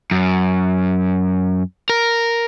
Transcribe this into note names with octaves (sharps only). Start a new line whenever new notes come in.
F#2
A#4